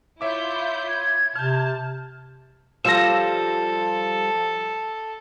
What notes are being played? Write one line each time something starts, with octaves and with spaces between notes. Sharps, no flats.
E4 F4 C#5 E5 D6 G6
G#6
C3 A5 F6 G6
F3 G3 F4 A4 E6 A#6